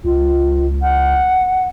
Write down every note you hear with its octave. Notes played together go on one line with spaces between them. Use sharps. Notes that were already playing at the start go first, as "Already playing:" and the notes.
C#2 F4
F#5